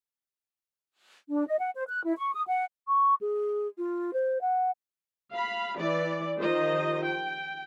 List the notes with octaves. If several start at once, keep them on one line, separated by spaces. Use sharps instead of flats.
D4
D#5
F#5
C5
F#6
E4
C#6
D#6
F#5
C#6
G#4
F4
C5
F#5
F5 B5
E3 D5
D#3 F3 F4 G4 C5 D#5
G5